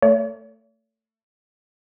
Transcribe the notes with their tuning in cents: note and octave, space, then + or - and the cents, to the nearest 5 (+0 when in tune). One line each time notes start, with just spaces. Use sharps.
A3 +25 C#5 +45